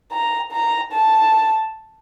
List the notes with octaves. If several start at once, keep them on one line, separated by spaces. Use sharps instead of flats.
A#5
A#5
A5